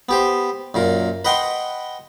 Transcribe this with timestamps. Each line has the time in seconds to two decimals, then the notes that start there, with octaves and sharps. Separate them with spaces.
0.09 B3 G4 C5
0.74 F#2 A#2 A#4
1.25 B4 D#5 F#5 G5 C6